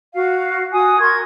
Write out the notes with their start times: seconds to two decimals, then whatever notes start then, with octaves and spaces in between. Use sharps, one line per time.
0.14 F#4 F5
0.72 F#4 G#5 D#6
0.99 A#4 C6 C#6 G#6